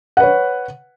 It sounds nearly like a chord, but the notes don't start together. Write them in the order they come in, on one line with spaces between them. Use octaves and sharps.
F#5 B4 C#5